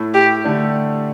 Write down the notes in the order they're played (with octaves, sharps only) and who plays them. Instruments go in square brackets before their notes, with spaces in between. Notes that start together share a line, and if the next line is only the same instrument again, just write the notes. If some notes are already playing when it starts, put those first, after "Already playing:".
Already playing: [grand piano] A2 A3 E4
[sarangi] G4
[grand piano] D3 A3 D4